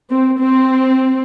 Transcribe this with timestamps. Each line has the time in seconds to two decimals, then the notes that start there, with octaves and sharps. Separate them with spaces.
0.10 C4
0.39 C4